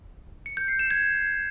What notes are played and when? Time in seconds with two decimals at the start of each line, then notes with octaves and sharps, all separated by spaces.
0.46 C#7
0.57 G6
0.68 C7
0.79 E7
0.91 G#6